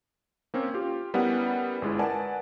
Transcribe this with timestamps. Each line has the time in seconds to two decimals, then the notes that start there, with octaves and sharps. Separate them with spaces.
0.54 A#3 C4 C#4
0.74 F4 G4
1.14 G3 B3 C#4 E4 A#4 F#5
1.82 G1 G#3 E4
1.99 A#4 B4 D5 F#5 G#5 A5